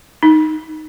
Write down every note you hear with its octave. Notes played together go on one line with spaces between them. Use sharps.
D#4